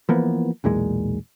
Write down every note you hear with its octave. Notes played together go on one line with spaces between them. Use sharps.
E3 F3 A#3 B3
B1 E2 A#2 G#3